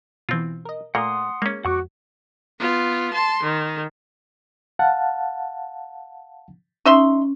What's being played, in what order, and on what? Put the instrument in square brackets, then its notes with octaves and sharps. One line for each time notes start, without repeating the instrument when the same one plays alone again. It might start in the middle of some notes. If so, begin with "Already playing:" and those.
[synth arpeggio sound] B2 E3 [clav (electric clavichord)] C4 F4
[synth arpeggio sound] A#4 D#5
[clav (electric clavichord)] A#2 A#3 [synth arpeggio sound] A3 [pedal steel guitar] F#5 C6 D#6
[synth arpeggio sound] G#3 [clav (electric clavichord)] A#3 C#4
[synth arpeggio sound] F2 [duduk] F#4 [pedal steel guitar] F#5 C#6 D6
[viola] B3 F4
A5 C6
D#3
[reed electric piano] F5 F#5 A5
[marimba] C#4 [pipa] D#4 E5 C6